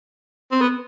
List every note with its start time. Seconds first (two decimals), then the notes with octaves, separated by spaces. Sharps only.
0.51 C4
0.61 B3